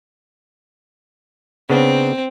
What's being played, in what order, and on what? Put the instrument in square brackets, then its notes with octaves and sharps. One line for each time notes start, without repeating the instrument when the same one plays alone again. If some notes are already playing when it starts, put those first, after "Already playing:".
[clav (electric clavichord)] C#3 B3 D4 [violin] C4